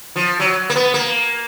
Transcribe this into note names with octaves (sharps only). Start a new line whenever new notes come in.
F3
F#3
A#3
B3
A#3